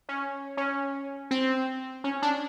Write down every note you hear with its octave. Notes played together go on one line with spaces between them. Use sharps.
C#4
C#4
C4
C#4
D4